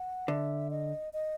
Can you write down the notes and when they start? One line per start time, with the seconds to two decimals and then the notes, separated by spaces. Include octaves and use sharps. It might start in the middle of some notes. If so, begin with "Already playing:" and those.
Already playing: F#5
0.28 D3 E5
0.71 D#5
1.13 D#5